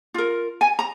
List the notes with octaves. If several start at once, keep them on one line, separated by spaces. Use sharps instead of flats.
F4 A#4
G#5
A#5